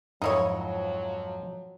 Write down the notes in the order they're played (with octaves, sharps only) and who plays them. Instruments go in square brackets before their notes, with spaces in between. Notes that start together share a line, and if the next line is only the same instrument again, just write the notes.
[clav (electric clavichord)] F2 G#2 D#5 [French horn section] F3 F#3 [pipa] D#4 E4 C#5